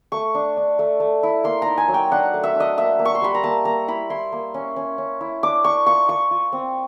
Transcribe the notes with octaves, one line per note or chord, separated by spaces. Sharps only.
A3 C#6
D4
D4
A3
A3
E4
A#3 C6
D#4 A#5
G#5
F#3
G5
D4 F#5
A3
E5
D4
D#5
A#3 E5
A#3
C#6
C6
G3 B5
A#5
A#3 A5
A#3 A#5
E4 B5
E4 C6
A#3
C#4
C#4
C#4
E4
D4 D6
D4 C#6
F4 C#6
F4 C#6
F4
C4